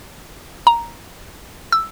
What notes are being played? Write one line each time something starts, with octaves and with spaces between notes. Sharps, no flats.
A#5
E6